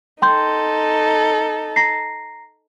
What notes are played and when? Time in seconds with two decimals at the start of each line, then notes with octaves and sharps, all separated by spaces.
0.22 D#4 A4 G5 C6 G6
1.76 A#5 A#6 C7